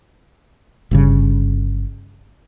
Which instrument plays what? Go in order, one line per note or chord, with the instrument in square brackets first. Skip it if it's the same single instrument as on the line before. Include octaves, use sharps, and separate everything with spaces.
[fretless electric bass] G1 G2 C#3